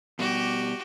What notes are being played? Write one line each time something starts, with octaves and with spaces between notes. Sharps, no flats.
B2 G3 F#4 G4